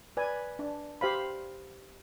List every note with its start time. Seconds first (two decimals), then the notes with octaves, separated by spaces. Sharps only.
0.17 B4 D5 G#5
0.59 D4
1.01 G4 C5 F5 B5